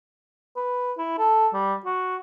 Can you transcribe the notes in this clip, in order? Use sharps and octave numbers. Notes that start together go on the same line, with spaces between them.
B4
E4
A4
G3
F#4